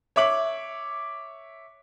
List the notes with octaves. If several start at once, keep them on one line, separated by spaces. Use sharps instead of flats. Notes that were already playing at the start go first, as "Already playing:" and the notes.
C#5 E5 D6 F#7